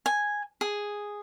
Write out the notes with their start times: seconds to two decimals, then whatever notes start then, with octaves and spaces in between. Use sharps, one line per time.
0.06 G#5
0.61 G#4